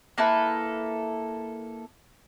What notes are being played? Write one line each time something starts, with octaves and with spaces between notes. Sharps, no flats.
A#3 E4 A4 B4